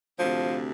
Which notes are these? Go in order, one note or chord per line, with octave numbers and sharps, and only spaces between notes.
D2 C3 F3